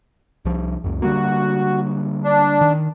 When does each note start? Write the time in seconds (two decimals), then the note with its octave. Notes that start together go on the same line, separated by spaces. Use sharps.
0.45 C2 F3
0.84 C#2 F#2
1.02 D3 G3 A#3 F#4
2.24 D4
2.61 D#3